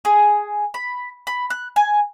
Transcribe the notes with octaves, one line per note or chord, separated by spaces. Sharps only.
G#4
B5
B5
F#6
G#5